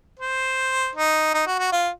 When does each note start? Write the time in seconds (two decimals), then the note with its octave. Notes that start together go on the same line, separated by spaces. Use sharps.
0.19 C5
0.95 D#4
1.34 D#4
1.46 F#4
1.59 F#4
1.72 F4